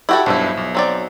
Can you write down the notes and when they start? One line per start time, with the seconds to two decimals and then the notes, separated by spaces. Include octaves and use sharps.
0.09 E4 F#4 G4 A4 F#5 G5
0.26 B1 G2 F3 E4
0.57 B1
0.75 F#3 C4 D5